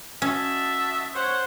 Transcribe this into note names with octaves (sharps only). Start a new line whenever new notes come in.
C#4 F#4 D#5 E5 A5
C5 C#5 F#5